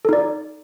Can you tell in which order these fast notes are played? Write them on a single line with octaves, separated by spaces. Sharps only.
A4 D#4 D5